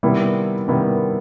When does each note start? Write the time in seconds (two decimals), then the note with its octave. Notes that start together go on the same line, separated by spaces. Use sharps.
0.03 C3 D#3 G3 B3 E4
0.68 C3 D#3 G3 B3 E4